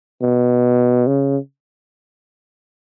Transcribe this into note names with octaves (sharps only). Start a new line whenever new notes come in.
B2
C#3